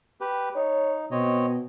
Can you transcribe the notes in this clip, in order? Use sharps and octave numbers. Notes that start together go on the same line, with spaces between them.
G4 B4
D#4 C#5
B2 C4 C#5 D#5